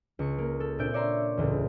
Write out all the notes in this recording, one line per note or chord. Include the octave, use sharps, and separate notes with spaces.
C#2 C#6 C#7
A#3
A4
A#2 C4 D4 E5 G6 D7
C#5 D5 E5 A#5 C6
E1 C#2 A2